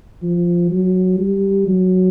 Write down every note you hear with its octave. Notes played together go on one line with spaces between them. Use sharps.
F3
F#3
G3
F#3